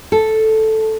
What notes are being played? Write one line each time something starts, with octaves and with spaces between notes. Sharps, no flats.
A4